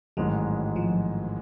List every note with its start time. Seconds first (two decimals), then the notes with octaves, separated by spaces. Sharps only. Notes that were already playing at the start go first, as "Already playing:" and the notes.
0.17 A1 G#2 D#3 F#3 G#3
0.76 F3